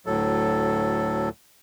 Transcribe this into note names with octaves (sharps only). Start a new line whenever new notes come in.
D2 A2 F#3 A4